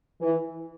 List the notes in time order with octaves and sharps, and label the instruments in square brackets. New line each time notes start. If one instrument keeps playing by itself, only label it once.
[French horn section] E3